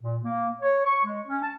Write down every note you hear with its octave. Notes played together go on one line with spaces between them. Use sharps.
A#2
A#3
C#5
C#6
G#3
C#4
A5